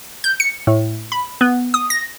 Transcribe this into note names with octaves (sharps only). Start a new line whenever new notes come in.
G6
C#7
A2
B5
B3
D#6
A#6